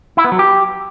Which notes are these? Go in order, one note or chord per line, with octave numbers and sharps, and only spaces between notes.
E4
B3
F#3
G4